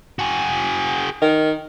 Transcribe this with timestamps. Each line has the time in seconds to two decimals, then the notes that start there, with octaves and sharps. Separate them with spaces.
0.19 F#4 G#4
1.22 D#3